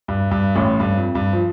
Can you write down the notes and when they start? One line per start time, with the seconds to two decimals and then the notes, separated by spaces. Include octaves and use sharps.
0.08 G2
0.31 G2
0.55 A1 A2
0.80 G2
0.97 F2
1.15 G2
1.33 F3